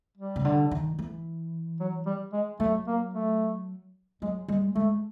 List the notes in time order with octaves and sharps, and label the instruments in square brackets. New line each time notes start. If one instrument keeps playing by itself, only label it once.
[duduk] G3
[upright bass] C#3
D3
D#3
E3
[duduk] F#3
G3
G#3
[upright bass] F#3 [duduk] A3
[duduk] A#3
A3
[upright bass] F#3 [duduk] G#3
[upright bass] G3 [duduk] G#3
[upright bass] G#3 [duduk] A3